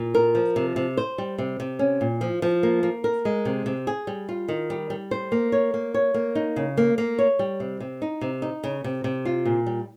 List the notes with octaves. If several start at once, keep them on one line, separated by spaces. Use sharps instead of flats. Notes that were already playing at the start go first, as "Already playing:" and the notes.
Already playing: A#2
A#4
F3
C3
C3
C5
G3
C3
C3
C#4
A#2
F3
F3
A#3
A#3
A#4
G#3
C3
C3
G#4
G3
F4
D#3
G3
G3
C5
A#3
C#5
A#3
C#5
A#3
D#4
C#3
A#3
A#3
C#5
G3
C3
C3
D#4
C3
D#4
C#3
C3
C3
F4
A#2
G3